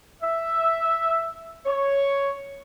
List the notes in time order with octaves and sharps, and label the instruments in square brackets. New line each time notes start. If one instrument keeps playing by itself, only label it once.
[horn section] E5
C#5